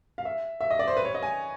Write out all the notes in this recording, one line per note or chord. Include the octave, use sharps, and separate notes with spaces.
F5
E5
E5
D#5
D5
C5
B4
C#5
D#5
G#5